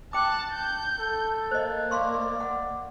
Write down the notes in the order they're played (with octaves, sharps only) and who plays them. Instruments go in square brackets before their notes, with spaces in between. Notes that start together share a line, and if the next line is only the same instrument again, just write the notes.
[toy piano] G5 D6 [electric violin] A5 F#6
[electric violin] G6
[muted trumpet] A4
[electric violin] A#3 [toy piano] C5 D#5
[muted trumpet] D5 [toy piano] F5 C6 C#6
[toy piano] F#5